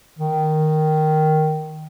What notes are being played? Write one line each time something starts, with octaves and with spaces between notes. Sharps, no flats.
D#3